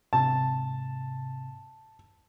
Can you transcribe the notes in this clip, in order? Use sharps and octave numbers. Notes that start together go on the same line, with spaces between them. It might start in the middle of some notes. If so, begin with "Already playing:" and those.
G#2 C3 A5